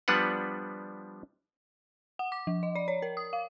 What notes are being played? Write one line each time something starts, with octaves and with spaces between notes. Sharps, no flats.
F3 G3 B3 D4 B4 F#5
F#5
D6
F3
D#5
D5
C#5
A#4
D#6
F5